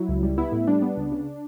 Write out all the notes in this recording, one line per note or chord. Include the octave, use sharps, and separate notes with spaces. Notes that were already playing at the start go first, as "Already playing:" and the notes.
Already playing: F#3 E4
C#2
G3
B3 E4
A2
G3 D4
B3
C#2
C#3